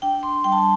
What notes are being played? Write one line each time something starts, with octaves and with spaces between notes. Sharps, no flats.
D4 G5
D4 C6
G3 G5
A5
G5